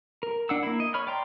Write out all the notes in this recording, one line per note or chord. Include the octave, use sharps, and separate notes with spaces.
A#4
D4 F#5 E6
A#3 E4
D#5
C#5 B5 F6
D5 G5 A#5 C6